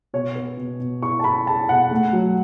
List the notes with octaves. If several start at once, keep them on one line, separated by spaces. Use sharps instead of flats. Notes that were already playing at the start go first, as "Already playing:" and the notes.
B2 C#5
B3
B2
B2
E4 C#6
A5
E4 B5
E4 A5
B2 F#5
A3
F#3